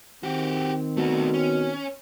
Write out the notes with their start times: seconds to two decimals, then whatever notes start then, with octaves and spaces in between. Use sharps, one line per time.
0.23 D#3 C4 F#4 G4
0.97 B2 A3 F#4
1.34 C#4